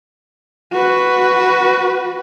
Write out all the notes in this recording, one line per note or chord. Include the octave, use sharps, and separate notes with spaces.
F#4 B4